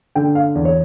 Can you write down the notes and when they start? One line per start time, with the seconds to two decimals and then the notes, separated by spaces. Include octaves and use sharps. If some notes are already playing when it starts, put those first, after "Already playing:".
0.15 D3 G5
0.35 F5
0.55 E2
0.65 C#5